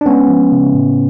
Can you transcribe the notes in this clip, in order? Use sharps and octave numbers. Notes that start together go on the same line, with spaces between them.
D4
G#3 B3 C#4
F3
C#3
A2